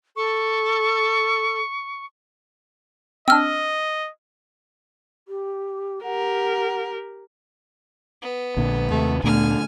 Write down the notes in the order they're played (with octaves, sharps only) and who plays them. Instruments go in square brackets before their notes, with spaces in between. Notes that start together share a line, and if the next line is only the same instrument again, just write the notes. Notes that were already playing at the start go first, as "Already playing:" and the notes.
[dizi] A4 [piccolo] C#6
[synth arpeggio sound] C4 D4 [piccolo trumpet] D#5 [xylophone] E6 F6
[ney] G4
[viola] G4 A#4 [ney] F#5
[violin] B3
[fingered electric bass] A#1 A#2 D3
[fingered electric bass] D#2 C3 [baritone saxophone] A3
[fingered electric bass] D2 A#2 B3 [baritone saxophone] D3 [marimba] A3 [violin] G#5 F6